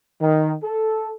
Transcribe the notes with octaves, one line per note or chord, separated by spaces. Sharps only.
D#3
A4